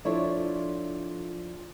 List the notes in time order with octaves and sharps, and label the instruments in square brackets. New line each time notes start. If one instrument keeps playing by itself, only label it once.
[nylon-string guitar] F3 D4 E4 A4 C#5